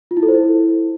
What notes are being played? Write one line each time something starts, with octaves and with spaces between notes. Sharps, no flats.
F4
E4
A4
C5
E4